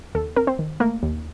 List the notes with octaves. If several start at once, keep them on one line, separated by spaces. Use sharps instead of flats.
D#2 A4
C4 A#4
C4 C5
D#3
A3 A#3 A#4
D#2